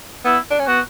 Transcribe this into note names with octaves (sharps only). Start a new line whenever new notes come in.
B3 E4
D4
C#4
B3 F#4